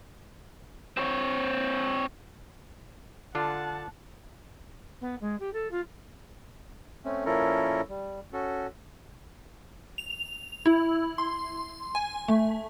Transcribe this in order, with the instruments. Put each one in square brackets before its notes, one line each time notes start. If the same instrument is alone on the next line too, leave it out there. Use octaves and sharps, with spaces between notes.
[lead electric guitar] C4 C#5
[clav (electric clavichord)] D3 D4 F4 [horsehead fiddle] F#5 A5
[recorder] B3
G#3
G4
A4
F4
[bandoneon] A3 C4 C#4
A#2 F3 C#4 E4 A4 A#4
G3
C#4 F#4 A4
[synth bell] F7
E4
C6
G#5
A3